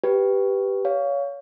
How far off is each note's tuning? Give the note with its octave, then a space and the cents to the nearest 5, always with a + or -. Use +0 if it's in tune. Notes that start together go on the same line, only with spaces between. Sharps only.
G4 +0 B4 +0
C#5 +25 F5 +0